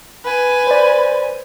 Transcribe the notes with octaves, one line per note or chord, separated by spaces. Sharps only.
B4 G#5
C5 D5